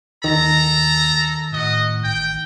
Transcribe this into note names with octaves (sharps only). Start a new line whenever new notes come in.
D#2 D#3 A4 A#5
A2 F#4 D#5
A1 G5